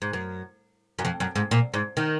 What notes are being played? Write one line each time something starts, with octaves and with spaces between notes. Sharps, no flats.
G#2
F#2
F#2
F2
F#2
G#2
A#2
G#2
D#3